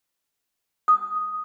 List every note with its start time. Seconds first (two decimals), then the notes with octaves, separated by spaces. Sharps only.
0.88 D#6